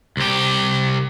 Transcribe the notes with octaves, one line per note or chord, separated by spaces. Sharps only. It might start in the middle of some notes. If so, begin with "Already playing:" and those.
C2 G4